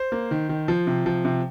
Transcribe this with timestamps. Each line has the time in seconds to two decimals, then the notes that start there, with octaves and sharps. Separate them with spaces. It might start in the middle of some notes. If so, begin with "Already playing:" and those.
Already playing: C5
0.12 A#3
0.31 D#3
0.49 D#3
0.68 F3
0.87 C3
1.06 F3
1.25 C3